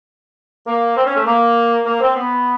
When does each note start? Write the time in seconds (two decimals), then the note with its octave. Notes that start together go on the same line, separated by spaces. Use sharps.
0.66 A#3
0.96 C4
1.06 C#4
1.16 A3
1.26 A#3
1.85 A#3
2.00 C4
2.15 B3